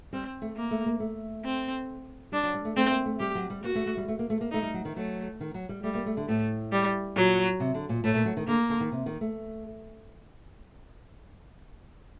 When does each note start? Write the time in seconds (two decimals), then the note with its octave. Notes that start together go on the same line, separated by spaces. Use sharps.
0.13 G3 C4
0.42 A3
0.57 A#3
0.71 A3
0.86 A#3
1.00 A3
1.45 C4
2.32 G3 D4
2.43 F#3
2.54 G3
2.65 A3
2.76 A3 C4
2.91 A#3
3.06 A3
3.20 G3 G4
3.35 F#3
3.50 G3
3.64 A#3 F#4
3.75 A3
3.86 A3
3.97 G3
4.08 A3
4.19 A#3
4.30 A3
4.41 A#3
4.51 A3 D#4
4.63 G3
4.74 F#3
4.85 D#3
4.96 F#3 A3
5.40 D#3
5.54 F#3
5.69 G3
5.83 G3 A3
5.95 A#3
6.06 A3
6.17 D3
6.28 A2 A3
6.72 G3
7.16 A#2 F#3
7.60 C3
7.74 D3
7.89 A#2
8.04 A2 A3
8.14 A#2
8.25 F#3
8.37 D#3
8.47 D3 A#3
8.70 D3
8.80 D#3
8.92 C3
9.06 D#3
9.21 A3